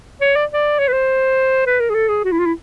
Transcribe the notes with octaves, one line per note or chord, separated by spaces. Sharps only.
C#5
D5
D5
C#5
B4
C5
B4
A#4
G#4
A4
G#4
F#4
E4
F4
E4